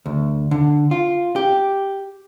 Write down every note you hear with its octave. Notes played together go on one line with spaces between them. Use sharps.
D2
D3
F4
G4